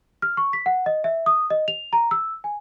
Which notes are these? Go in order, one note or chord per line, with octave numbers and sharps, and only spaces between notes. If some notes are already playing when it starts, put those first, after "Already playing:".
F6
C#6
B6
F#5
D#5
E5
D#6
D#5
F7
A#5
E6
G#5